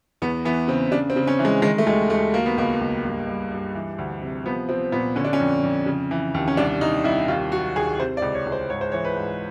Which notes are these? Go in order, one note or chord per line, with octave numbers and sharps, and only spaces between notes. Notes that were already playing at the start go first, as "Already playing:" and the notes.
E2 B3
E3 B3
C#3 C4
C#3 D4
C4
C#3
C#4
E3
G#3
D#3 G#3
A3
D#2 G#3
D#2 A3
F#3 A#3
B3
C#2 A#3
C#2
G2
G2
G2
E3
D2
C3
F3 B3
F3 C4
A#2 B3
D3 C#4
D4
C#4
F2
F2
C#3
E3
D#2
C#4
C2 D4
C2 D#4
C2 E4
D#2 F4
F#3 F#4
D#2 G#4
C3 C5
D5
C#2
C#5
C#2
C5
G#2 C#5
C5
E3 C#5
B4
G#2